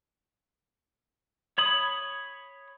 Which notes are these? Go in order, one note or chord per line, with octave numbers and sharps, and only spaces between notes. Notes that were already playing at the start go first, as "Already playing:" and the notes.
C#5 B5 D#6